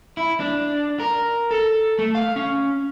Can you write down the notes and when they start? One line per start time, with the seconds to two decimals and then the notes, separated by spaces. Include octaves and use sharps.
0.17 E4
0.40 D4
1.00 A#4
1.51 A4
1.99 A3
2.15 F5
2.36 C#4